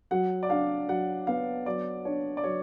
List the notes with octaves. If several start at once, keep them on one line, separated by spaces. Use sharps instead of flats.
F#3 F#5
D5
D4 F5
F#3 F#5
B3 F5
F#3 D5
D4 C#5
D5
F#3 C#5